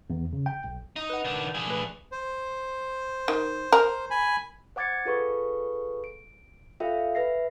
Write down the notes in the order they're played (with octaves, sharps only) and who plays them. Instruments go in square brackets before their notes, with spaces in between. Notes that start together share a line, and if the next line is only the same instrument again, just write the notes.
[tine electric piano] E2
C#3
G5
B1
[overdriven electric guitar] D#4
[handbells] B4 F#5
[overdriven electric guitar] D#3 D4
D4 G#4
[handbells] A3 B4
[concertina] C5
[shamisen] D#3
A#4
[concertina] G#5 B5
[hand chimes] C5 F#5 D6 G#6 A6 C#7
F4 G#4 A4 B4 C#6
D7
F4 A4 E5 F5 G5
B4 E5 A#6 C7